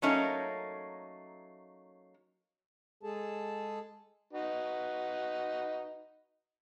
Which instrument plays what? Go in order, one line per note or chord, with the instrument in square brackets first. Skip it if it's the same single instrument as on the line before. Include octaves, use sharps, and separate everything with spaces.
[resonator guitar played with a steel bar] F#3 A3 A#3 C#4 D#4
[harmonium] G#3 G#4 A4 A5
[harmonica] D#4 F#4 B4